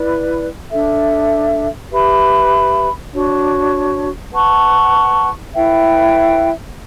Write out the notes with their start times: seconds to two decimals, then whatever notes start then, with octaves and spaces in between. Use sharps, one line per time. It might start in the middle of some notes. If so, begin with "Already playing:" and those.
Already playing: E4 B4 D5
0.71 D4 A4 E5
1.92 G4 B4 E5 B5
3.13 D4 F#4 C#5
4.33 B4 F#5 A5 C#6
5.53 E4 B4 E5 G5